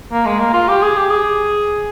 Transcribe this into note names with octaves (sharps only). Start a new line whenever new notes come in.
A#3
G#3
A#3
F4
G4
G#4
G4
G#4